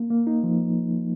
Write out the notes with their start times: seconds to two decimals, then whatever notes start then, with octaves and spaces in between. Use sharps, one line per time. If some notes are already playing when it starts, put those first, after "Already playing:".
Already playing: A#3
0.10 A#3
0.27 D#4
0.43 F3